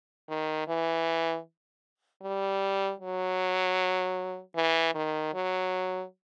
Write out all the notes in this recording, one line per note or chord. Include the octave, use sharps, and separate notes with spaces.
D#3
E3
G3
F#3
E3
D#3
F#3